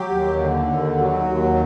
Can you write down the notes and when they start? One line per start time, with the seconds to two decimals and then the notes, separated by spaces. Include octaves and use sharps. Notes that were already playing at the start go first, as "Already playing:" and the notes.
Already playing: F#3 G4
0.10 D#2
0.39 D3
0.68 D#2
0.97 F#3
1.26 D#2